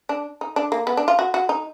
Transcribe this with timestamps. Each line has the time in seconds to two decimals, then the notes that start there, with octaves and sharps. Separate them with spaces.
0.09 D4
0.41 D#4
0.56 D4
0.72 A#3
0.87 B3
0.97 D4
1.08 F4
1.19 F#4
1.34 F#4
1.49 D#4